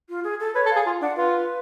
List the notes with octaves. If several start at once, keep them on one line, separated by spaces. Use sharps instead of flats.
F4
G#4
A4
B4 C#5
A4
F5
G#4
F4
D4 F#5
F4 B4